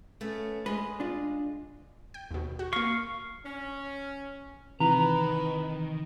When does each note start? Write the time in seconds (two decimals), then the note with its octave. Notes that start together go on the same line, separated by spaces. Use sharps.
0.21 A3 B3 C#4
0.66 G#3 B4 D#5
1.00 D4 F4
2.14 G5
2.31 D#2 B2
2.59 F#4
2.73 A#3 F5 C#6 A#6
3.45 C#4
4.80 C3 D#3 E3 B4 A#5